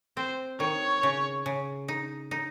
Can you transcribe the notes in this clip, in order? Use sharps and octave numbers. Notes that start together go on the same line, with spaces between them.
C4 C5
D#3 C#5
C#3
C#3
D#4
D#4